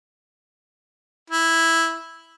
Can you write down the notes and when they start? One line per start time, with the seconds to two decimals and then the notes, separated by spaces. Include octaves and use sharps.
1.30 E4